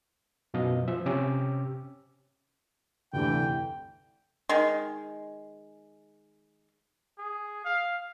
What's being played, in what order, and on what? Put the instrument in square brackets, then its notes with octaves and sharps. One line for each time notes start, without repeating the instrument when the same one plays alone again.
[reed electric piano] F#2 B2 F3 D#5 F5
F3 E5
C3 C#4 G4 D6 E6
[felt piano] F1 D2 G2 [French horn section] D3 E3 [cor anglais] G5
[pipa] D#3 G#3
[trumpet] G#4
F5